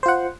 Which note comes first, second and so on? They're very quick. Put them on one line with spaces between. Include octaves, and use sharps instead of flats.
C5 F4 F#5